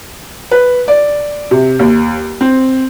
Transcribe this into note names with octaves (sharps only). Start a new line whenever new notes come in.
B4
D5
C3
D#2
C4